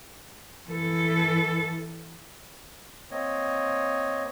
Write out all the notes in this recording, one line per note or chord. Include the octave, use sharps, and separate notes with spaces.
E3 A4
A#3 C4 C#5 D#5